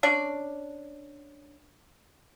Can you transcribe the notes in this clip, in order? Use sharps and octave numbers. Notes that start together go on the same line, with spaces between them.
C#4 D4 D5